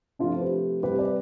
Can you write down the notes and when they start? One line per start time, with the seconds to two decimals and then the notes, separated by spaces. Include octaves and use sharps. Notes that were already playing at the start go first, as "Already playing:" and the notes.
0.19 C3 F3 A3 D4 F4
0.36 C5
0.41 G4 B4
0.83 C3 G3 G4 B4
0.99 B4 D5